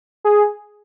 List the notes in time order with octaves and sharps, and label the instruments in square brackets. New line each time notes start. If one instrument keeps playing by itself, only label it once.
[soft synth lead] G#4